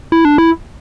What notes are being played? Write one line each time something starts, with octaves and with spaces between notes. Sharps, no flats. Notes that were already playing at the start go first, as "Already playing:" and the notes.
E4
D4
E4